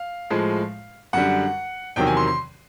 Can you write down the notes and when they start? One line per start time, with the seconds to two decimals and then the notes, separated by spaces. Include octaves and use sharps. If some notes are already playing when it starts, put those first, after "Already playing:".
Already playing: F5
0.30 A2 F3 G#3
1.13 F#2 D3 G3 F#5
1.96 E2 C3 D#3 F#3 G5
2.07 G#5
2.17 C6
2.27 C6